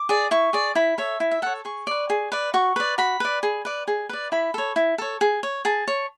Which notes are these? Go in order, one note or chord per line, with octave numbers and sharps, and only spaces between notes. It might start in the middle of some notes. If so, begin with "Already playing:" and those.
Already playing: D6
G#4 D5
E4 C#6
G#4 D5
E4 B5
A4 C#5 E5
E4
E5
A4 C#5 F#5
G#4 C#6
B4 D5
G#4
B4 D5
F#4 C#6
B4 D5
F#4 B5
B4 D5
G#4
B4 D5
G#4
B4 D5
E4 B5
A4 C#5
E4
A4 C#5
G#4
C#5
G#4 A5
C#5